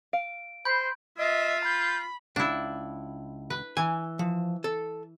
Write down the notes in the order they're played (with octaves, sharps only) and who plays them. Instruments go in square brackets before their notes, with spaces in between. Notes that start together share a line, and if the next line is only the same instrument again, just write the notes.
[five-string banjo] F5 [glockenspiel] D7
[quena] C5 [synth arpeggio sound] B5 C6 [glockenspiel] G6
[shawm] F4 [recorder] D#5 [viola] E5
[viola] B5 [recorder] G6
[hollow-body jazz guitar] C#2 [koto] D4 E4
[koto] B4
[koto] E3 [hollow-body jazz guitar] G#5
[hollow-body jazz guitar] F3
A4